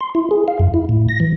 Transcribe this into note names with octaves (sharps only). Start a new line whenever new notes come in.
C6
E4
G#4
F5
F#2
E4
A2
A#6
E3